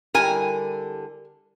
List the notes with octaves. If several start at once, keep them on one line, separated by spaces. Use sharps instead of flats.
D3 G3 E4 A#4 G#5